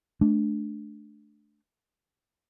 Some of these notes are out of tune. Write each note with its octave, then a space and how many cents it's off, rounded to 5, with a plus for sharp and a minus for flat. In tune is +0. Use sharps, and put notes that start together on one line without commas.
A3 -25 D4 +0